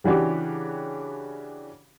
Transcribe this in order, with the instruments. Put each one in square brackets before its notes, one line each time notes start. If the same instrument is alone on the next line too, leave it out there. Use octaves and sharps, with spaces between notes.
[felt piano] C#3 E3 D4 F#4 G4